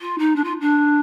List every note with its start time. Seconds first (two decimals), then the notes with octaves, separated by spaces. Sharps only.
0.01 F4
0.19 D#4
0.36 D4
0.44 F4
0.61 D4